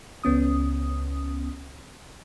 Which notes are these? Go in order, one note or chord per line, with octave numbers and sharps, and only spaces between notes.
C#2 B3 C#4 D#6